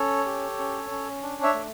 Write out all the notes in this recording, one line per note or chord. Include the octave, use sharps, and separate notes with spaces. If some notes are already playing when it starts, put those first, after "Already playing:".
Already playing: C#4 A4 C#5
G4
C#4
C#4
D4
C#5 E5
A3